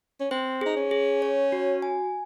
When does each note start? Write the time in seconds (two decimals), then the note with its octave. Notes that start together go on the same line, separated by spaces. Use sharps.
0.20 C#4
0.31 C4 C5
0.61 D#4 G#4
0.77 C#4
0.91 G#4
1.22 C#5
1.52 F#4
1.82 G#5